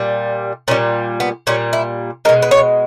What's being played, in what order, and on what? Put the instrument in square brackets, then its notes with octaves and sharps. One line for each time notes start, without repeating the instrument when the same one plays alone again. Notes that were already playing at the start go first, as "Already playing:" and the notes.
Already playing: [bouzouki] A#2 G3
A#2 C#4
G3
B3
A#2 G3 C#4
E4
G#3 A#4
B2
B4
C#5